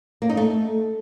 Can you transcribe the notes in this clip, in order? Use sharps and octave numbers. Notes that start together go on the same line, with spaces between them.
A#3
D#4
A3